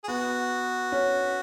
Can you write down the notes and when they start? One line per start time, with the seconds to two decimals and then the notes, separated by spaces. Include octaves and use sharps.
0.04 G#4
0.08 B3 F#4
0.92 C#4